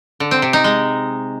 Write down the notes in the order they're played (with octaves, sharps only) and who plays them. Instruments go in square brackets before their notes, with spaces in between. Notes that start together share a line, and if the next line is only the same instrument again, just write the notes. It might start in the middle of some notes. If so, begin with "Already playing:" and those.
[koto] D3
C4
C3
D#4
G#3